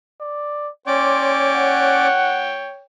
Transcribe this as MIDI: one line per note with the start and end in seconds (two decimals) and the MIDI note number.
0.21 0.70 74
0.87 2.07 61
0.87 2.82 73
0.87 2.07 74
0.87 2.82 79
0.87 1.32 84
0.87 2.07 86
1.55 2.54 78